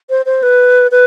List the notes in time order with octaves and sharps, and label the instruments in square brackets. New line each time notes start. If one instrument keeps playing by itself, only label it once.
[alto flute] C5
C5
B4
B4